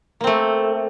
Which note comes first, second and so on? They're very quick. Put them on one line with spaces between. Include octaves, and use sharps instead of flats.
A#3 C4 A3